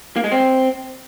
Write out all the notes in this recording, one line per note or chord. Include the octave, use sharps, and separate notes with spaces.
A#3
G#3
C4